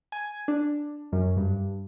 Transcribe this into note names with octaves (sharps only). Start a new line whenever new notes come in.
G#5
D4
F#2
G2